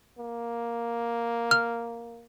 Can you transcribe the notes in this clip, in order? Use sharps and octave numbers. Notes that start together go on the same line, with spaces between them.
A#3
F6